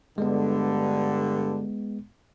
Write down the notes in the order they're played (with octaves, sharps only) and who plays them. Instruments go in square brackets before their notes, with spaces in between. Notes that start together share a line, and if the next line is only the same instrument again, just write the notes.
[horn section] G2 D3 [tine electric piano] G#3 B3